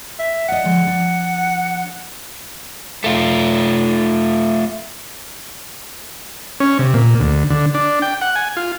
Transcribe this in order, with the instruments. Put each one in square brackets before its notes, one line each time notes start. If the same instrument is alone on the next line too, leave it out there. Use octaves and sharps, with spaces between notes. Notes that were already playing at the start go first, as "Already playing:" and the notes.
[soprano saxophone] E5
[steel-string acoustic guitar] D5 D#5 [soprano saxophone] F#5
[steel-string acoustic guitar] D3 F3 G#3
F3 D4
[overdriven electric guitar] A3 F4
[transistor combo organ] C#4
C3
A#2
D2
D3
D4
G5
F#5
G#5
F4